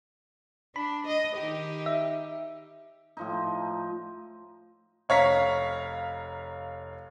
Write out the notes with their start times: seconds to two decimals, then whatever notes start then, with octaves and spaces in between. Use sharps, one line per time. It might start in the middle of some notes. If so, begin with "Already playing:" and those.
0.76 D4 B5
1.07 D#5
1.36 D#3 D#4 G4
1.86 E5
3.17 A2 F3 D#4
5.09 F1 C#5 F5 A#5 B6